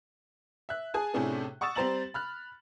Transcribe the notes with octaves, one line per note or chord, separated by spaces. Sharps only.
E5 F#6
G#4 G#5 A5
A2 C3 A3 C#4 D4 G#4
F#5 C#6 D#6 E6 A6 E7
G3 C4 C5 A#5 A6 F#7
B5 F6 F#6